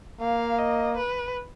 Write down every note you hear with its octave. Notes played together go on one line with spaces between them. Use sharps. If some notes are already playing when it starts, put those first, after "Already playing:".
A#3 F5
D#5
B4